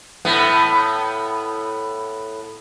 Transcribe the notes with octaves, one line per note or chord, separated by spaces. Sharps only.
A2 B3